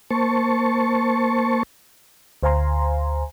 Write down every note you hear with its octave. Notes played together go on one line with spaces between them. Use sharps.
A#3 C5 A5 C#6
D2 C5 F5 G#5 A#5 C6